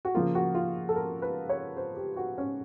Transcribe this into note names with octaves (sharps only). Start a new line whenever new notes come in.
F#4
C#3 F3 A#3 F4
F#4
F4
A4
A#4
B4
C#5
C5
G4
F#4
C#4